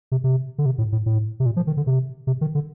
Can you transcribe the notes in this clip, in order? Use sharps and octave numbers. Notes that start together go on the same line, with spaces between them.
C3
C3
D3
C3
A2
A2
A2
C3
A#2
F3
D#3
D3
C3
C3
D#3
D3